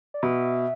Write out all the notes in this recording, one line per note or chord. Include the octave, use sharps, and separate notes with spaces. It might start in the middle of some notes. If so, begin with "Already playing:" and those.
D5
B2 E5